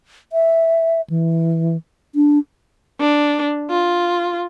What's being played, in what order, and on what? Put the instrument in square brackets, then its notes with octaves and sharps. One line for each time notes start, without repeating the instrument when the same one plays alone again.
[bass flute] E5
E3
D4
[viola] D4
F4